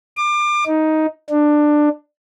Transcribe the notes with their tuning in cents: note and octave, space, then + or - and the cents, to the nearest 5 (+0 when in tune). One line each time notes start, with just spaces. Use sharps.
D6 +30
D#4 +10
D4 +15